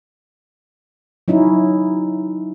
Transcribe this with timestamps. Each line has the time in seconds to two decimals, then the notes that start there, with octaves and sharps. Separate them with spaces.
1.28 F#3 C#4 D#4 E4